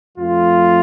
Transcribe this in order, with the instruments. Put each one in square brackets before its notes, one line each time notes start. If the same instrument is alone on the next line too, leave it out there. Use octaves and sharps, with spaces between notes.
[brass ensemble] F2 F3 A3 F4